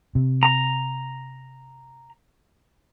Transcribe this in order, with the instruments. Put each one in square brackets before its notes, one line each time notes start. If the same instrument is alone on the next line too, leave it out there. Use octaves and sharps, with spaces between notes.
[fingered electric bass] C3
[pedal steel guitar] A#5